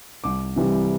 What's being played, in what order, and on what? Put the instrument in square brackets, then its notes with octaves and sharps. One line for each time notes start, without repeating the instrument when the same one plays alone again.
[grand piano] C2 D6
C3 E3 G3